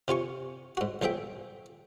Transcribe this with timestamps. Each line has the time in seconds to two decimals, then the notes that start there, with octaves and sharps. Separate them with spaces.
0.08 C3 F4 G#5 C#6
0.77 G#2 F#4
1.02 B1 F3 G#4 E5 G5